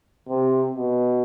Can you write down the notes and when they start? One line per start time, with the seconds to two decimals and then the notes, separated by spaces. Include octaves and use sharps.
0.29 C3
0.75 B2